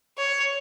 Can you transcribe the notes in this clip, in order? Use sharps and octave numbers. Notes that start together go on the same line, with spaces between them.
C#5